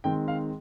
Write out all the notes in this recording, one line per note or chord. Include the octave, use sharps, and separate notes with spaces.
D#3 G#3 C4 G5
F5